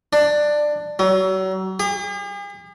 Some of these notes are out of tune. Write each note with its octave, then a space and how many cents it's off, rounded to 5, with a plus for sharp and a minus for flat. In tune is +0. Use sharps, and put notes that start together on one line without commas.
D4 +15
F#3 +35
G#4 -45